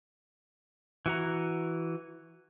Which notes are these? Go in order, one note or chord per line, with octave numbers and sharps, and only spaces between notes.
E3 F#4 A#5